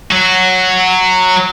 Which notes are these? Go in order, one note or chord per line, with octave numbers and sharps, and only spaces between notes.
F#3 F#4